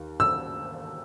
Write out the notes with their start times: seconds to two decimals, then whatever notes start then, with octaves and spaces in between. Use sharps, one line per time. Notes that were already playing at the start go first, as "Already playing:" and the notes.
Already playing: D#2
0.20 E6